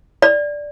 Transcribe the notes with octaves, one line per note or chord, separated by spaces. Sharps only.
D5